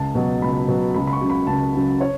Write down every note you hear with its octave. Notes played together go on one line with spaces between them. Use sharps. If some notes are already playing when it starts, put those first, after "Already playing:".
Already playing: C#2 A5
B2 F#3
C#2 B5
B2 F#3
C#2 B5
B5
C#6
C#3 F#3
B5
C#2 A5
C#3 F#3
C#5